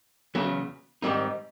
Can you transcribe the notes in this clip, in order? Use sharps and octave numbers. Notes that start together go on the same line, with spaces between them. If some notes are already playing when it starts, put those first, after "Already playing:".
E2 C#3 F#3 B3
G#2 D#3 G3 C4 D#4